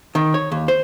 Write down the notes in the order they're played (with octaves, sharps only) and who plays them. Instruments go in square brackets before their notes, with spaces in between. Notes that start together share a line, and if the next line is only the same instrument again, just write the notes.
[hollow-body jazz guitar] D#3
C#5
D#2
C5